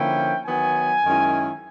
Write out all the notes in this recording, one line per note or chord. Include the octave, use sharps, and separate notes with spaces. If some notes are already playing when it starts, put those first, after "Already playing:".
Already playing: D3 F3 A#3 C#4 E4 G5
D#3 F#3 B3 G#5
F#2 D#3 G#3 C#4 E4